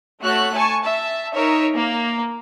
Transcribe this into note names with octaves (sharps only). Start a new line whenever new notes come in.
A3 F#4 C#5 F#6
G#5 A5 C#6
E5 A5
D#4 A#4 C#5 E5
A#3